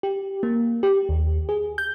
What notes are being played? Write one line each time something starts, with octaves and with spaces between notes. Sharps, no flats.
G4
A#3
G4
D#2
G#4
G6